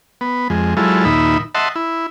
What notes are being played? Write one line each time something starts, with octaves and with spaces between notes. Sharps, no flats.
B3
F2 G#3
F#3 G#3 E4 F4 A4
D#2 A#2 D#4 E5 B5
D#5 E5 F#5 A5 C6
E4